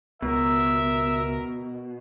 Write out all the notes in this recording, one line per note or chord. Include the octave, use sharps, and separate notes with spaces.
C#2 B2 A#4 E5